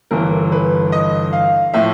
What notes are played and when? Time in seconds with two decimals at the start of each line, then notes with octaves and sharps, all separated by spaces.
0.11 G1 G2 E3 A#4
0.52 B4
0.92 D#5
1.33 F5
1.74 A2 F3 E5